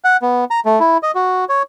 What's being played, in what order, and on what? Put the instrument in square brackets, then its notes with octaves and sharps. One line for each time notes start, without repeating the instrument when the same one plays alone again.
[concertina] F#5
B3
A#5
A3
E4
D#5
F#4
C#5